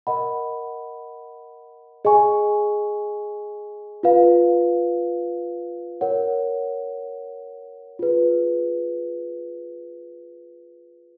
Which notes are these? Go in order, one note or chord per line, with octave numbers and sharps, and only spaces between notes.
A#4 D#5 F#5 B5
G#4 D#5 G#5 C#6
F4 B4 F5
A#4 C#5 F#5
F4 G#4 B4